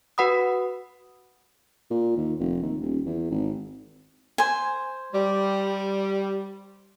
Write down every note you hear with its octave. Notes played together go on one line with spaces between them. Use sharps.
F#4 B4 F#5 B5 D#6
A#2
D#2
F1
D#2
D#1
E2
G#1
C5 G#5
G3